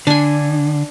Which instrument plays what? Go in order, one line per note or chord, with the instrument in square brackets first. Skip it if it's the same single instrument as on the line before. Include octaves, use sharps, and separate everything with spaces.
[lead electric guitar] D3 [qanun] D4 G#5